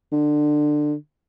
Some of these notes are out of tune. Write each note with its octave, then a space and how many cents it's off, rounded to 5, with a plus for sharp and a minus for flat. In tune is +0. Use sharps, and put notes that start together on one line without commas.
D3 +20